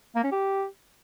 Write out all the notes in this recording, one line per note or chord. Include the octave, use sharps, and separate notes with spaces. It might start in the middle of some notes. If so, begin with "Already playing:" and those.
A#3
C#4
G4